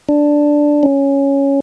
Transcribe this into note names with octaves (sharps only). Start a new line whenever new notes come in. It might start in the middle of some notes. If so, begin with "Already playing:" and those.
D4
C#4